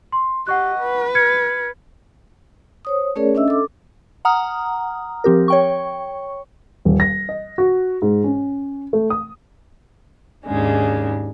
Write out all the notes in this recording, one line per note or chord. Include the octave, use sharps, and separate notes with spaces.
C6
G4 D#5 F#5 C#6 F#6
B4
F6 G#6 C#7
C5 C#5 D#6
A3 C#4 G#4 A#4 C#5 D5
C#4 D4 D#5 E5 E6
A4 D6
F#5 A#5 D#6 F6
F3 C4 G4 A#4
C#5 G5 C#6
D#1
A#6
D#5
F#4
G#2
C#4
A3
D#6
D#2 G#2 C#3 G#3 D4